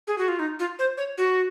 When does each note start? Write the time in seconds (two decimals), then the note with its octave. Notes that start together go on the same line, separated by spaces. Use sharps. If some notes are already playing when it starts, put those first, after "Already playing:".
0.07 G#4
0.18 F#4
0.28 F4
0.39 D#4
0.59 F4
0.79 C5
0.97 C#5
1.18 F#4